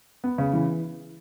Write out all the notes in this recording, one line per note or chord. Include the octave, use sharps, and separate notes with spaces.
B3
C#3
E3